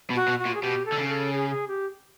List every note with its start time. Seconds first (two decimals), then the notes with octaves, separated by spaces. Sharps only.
0.10 B2
0.15 F#4
0.28 B2
0.39 F#4
0.46 A#2
0.54 G#4
0.62 B2 G4
0.86 A4
0.92 D3
0.98 C#3
1.09 A4
1.33 G#4
1.50 G#4
1.68 G4